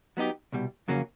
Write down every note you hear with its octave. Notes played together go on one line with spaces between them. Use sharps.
F#3 B3 D#4 G4
C2 B2 G3
F2 C#3 F#3 A#3 C#4